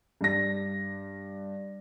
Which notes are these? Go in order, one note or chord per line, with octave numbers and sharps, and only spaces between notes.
G2 A#6